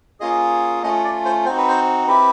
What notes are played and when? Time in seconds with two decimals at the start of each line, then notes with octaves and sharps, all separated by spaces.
0.20 A#3 C#4 F4 G#4 D#5
0.83 A3 C#4 F4 D#5
1.04 D5
1.25 C5
1.45 C4 D#4 F#4 C5
1.57 B4
1.68 C5
2.08 C4 E4 G4 B4